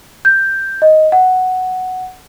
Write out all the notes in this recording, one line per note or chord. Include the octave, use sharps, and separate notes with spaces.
G6
D#5
F#5